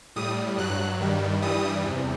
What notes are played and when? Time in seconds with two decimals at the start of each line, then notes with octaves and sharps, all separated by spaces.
0.16 A2 G3 D#6
0.57 G2 F#3 F#6
1.00 G2 D#3 G3
1.42 G2 E3 G3 D#6
1.84 E2 C3